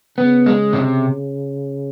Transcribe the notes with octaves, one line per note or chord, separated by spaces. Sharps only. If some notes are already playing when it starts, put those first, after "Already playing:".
C#3 B3
G#3
C3